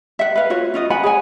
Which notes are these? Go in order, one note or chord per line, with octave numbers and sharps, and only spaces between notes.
E5 F#5
B4 F5
F4 F#4 C#5
C#4 F4 D#5
F#5 G#5 B5
G#4 C#5 G#5